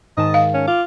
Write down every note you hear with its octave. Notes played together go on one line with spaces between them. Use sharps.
G#2 D#3 D#5 A5
F5
C#4
F4 D6